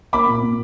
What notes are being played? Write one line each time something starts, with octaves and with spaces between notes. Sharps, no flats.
A#3 B5 D6
A#2
A#2